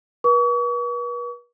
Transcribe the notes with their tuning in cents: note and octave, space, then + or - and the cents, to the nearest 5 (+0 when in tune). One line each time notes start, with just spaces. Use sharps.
B4 -40 C#6 +40